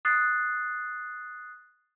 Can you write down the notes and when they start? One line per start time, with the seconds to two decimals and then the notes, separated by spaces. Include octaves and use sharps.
0.05 D#6 F#6 A6 C7